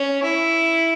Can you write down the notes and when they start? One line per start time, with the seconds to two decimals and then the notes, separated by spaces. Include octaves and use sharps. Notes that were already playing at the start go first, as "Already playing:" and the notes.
Already playing: C#4
0.23 E4